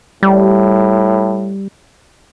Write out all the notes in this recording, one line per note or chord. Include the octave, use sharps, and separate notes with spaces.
A2 G3